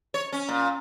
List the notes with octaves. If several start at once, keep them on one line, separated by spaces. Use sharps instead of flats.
C#5
C#4
A#2